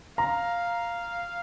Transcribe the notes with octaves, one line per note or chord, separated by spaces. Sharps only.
F5 A#5